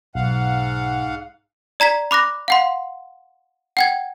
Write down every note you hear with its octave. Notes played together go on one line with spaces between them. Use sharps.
B1 G#2 F5 F#5
D5 A#5 G#6 B6
B5 D6 F#6 A#6
F5 F#5 C6
F#5 G5 G#6